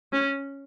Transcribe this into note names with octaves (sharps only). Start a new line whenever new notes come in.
C#4